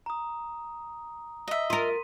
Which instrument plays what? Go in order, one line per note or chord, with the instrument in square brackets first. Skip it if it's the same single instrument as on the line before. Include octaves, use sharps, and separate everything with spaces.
[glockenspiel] A#5 D#6
[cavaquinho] D#5 E5
[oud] F4 A#4 [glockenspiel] C6 B6 D#7